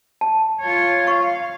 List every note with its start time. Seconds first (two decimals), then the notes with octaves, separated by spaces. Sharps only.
0.21 A5
0.62 F4 C#5
1.07 F5 C#6